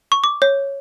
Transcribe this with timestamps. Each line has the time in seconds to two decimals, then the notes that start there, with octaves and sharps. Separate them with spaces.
0.12 C#6
0.24 D6
0.42 C#5